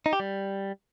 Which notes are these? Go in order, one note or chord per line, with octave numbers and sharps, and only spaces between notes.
D#4
G4
G3